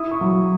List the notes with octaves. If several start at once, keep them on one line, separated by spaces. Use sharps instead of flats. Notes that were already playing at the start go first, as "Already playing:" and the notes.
Already playing: E4 D#6
C#6
F#3